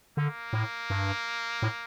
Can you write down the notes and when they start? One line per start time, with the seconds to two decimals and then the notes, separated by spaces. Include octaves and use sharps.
0.17 D3 A#3
0.53 A2
0.90 G2
1.62 A2